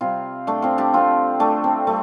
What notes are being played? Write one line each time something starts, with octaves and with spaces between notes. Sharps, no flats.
C3 G3 C4 F4
A3 D4
C4 F4
D4 G4
D3 A3 C4 F4
A3 D4
C4
G3 A3